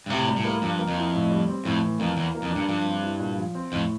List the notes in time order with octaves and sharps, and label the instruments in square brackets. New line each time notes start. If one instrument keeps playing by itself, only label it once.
[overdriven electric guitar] G2
[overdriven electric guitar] A2 [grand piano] C3
[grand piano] G3
[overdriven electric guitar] A2
[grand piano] A#3
[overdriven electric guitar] G2 [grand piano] F3
[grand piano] A#3
[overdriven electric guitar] F2
[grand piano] E4
A2
G3
C4
[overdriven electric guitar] F2 [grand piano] A2
[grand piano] E3
[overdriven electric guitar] F2 [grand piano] A#3
[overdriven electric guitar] E2 [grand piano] E3
[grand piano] A#3
[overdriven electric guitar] F2
[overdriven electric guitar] G2 [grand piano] D4
[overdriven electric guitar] G2 [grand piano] F3
[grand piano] C4
E4
A#2
F3
C4
[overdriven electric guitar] F2 [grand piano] A2